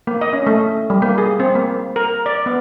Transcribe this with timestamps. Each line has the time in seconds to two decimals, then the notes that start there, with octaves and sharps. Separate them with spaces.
0.07 A#3
0.21 D#5
0.33 C#4
0.47 A3
0.90 G3
1.02 A#3
1.18 G#4
1.40 C4
1.55 A#3
1.96 A#4
2.26 D5
2.46 B3